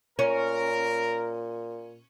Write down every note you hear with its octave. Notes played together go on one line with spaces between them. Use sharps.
A#2 C#4 A#4